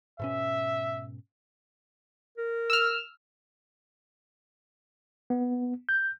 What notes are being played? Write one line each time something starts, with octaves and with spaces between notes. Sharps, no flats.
G#2 B2 C#4 E5
A#4
E6 F6
B3
G6